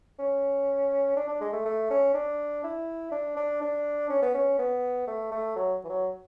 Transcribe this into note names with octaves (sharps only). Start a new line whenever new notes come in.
C#4
D4
D4
G#3
A3
A3
C#4
D4
E4
D4
D4
D4
C#4
B3
C#4
B3
A3
A3
F#3
E3
F#3